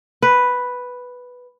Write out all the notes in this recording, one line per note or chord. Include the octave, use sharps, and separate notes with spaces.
B4